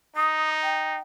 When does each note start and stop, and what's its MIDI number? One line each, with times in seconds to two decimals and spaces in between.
0.16 0.99 63
0.16 0.49 87
0.63 0.99 79